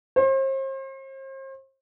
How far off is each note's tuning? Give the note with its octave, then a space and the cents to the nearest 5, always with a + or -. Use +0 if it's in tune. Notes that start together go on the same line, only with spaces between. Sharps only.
C5 +40